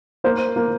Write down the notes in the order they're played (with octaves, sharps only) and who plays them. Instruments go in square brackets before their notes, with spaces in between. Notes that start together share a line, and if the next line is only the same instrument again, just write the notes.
[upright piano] A#3 C5
A#3